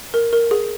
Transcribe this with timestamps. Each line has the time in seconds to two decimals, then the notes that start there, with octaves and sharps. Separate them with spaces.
0.14 A#4
0.33 A#4
0.51 G#4